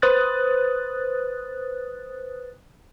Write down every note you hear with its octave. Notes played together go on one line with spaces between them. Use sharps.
B4 C5 D#6 F#6 A6